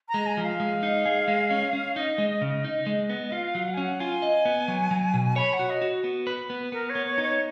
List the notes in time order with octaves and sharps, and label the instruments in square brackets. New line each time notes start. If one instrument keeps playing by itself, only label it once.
[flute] A#5
[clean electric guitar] G#3
[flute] G#5
[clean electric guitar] F3
[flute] F5
[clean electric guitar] G#3
D#4
G#4
G#3
C#4
C#4
[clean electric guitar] D#4 [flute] D#5
[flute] D#5
[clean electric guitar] G#3
[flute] D#5
[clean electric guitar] C#3
[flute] D#5
[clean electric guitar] D#4
G#3
B3
[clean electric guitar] F4 [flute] F5
[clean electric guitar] F#3
[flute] F#5
G#5
[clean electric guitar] C#4 [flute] F#5
[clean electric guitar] F4 [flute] G#5
[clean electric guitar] D#5
B3
F#3
F#3
B2
[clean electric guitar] C#5 [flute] B5
[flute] F#5
[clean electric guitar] F#4
[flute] D#5
[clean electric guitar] F#4
B3
B4
B3
[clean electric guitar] B3 [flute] A#4
[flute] C#5
[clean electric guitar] B3
[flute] C#5
[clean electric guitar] D#4
[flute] C#5